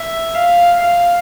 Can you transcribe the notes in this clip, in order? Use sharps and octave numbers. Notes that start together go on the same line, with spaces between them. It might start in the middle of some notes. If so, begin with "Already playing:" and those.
Already playing: E5
F5
F5